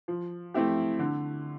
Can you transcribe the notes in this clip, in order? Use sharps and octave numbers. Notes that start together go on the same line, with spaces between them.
F3
A3 C4 E4 G4
D3